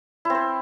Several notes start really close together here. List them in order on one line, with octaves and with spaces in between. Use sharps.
E4 C4 C5